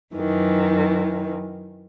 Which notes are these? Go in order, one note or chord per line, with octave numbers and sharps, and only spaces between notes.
F#2 D#3 E3